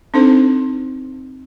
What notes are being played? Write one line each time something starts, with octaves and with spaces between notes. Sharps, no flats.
C4 D4 D#4 A4 C5